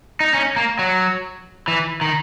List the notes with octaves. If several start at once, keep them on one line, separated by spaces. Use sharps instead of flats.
D#4
C#4
A#3
F#3
E3
D#3